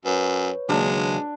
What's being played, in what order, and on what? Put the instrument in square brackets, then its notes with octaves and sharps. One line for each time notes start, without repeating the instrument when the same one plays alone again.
[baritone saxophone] F#2 [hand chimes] B4 C#5
[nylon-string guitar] D#2 C#3 F#3 [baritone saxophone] G#3 [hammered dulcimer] D4